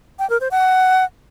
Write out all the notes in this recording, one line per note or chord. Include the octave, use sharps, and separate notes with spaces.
G5
A#4
C5
F#5